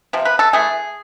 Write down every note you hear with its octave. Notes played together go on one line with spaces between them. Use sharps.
C3 F3
B4
A4
E3 A3 G#4